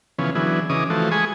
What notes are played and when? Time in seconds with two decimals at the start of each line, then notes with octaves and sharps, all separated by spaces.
0.19 C#3 E3 F3 B3 C#4
0.35 D3 E3 F#3 B3 E4 G#4
0.70 C#3 E3 C#4 D#5 D6 D#6
0.90 E3 F3 A3 F#4 A4 C5
1.11 G#3 G#4 G#5 B5 C#6 D#6